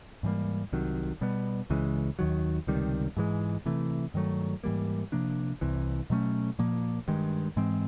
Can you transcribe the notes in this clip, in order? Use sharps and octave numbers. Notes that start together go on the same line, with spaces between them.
G#2 E3 G3 A#3
C2 C3 D#3 F#3
B2 G3 B3
C#2 C#3 E3 G#3
D#2 D#3 F#3
C#2 C3 D#3 G3
G#2 E3 G#3
C3 E3 A3
G2 D#3 F#3 A3
G#2 E3 G3 A#3
C3 F3 A#3 D4
C2 C3 E3
B2 F#3 A3 C#4
A#2 F3 A#3
G2 D#3 G#3
G#2 E3 G#3 C4